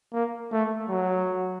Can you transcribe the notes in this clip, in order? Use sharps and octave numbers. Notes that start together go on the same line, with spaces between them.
A#3
A3
F#3